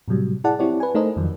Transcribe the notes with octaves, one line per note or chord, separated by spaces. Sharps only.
A2 C3 F#3 G3
E4 G#4 D5 F#5 A5
C4 E4 G4 C#5 D5
B4 G#5
A3 D#4 A4 A#4 C5 D#5
F2 D#3 F3 F#3